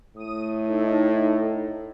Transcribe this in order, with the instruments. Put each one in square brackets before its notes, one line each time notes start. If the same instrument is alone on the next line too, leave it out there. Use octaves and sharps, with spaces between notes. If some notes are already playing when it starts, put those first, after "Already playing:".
[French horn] A2 [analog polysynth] D#6 D#7
[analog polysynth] D#4 A4